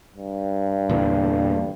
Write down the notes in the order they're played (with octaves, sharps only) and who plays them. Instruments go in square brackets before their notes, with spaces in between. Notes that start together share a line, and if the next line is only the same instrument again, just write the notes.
[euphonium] G2
[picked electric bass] E2 A#2 D3